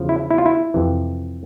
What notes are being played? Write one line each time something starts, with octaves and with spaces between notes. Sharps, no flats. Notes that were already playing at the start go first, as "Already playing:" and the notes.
Already playing: E2 C#3 F3
E4
E4
F4
E4
F2 C3 E3